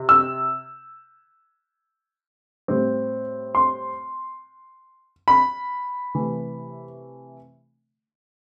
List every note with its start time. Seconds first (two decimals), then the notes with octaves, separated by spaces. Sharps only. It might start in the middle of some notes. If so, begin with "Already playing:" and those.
Already playing: C3
0.09 E6
2.68 A2 G3 C4
3.55 C6
5.28 B5
6.14 C3 E3 A3